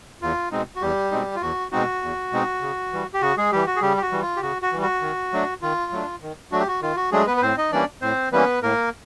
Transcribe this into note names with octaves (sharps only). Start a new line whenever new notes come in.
E2 F4
B2 G#3 C4 D#4
F#4
E2 G3 G4
B2 G#3 C4 D#4
F4
E2 F#4
B2 G#3 C4 D#4 F#4
E2
B2 G#3 C4 D#4
C#3
E3 G3
G4
C#3 F#4
G#3 G#4
E3 G3 G4
F#4
G#4
C#3 G3 G4
G4
F#4
E3 G3
F4
G4
C#3 F#4
F#4
E3 G3
F#4
D#3
F#3 A3 D4
D#3 F4
F#3 A3 D4
D#3
F#3 A3 D4 F#4
G4
F#4
D#3 F4
F#4
F#3 G#3 A3 D4 G#4
B3 B4
B4
A2 C4 C5
D#4 D#5
E3 G3 A#3 C#4 D4 D5
A2 C4 C5
E3 G3 A#3 B3 C#4 B4
A2 A#3 A#4